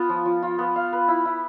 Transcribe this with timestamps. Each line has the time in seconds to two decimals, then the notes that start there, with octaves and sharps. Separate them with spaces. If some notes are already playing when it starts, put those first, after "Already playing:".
Already playing: B3 F4
0.09 F3
0.25 F3
0.43 F4
0.58 B3
0.76 F5
0.93 B4
1.08 E4
1.25 E4